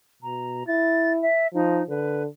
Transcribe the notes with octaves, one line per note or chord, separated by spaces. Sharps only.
B2 A#5
E4 A6
E5
F3 D#4
D3 B4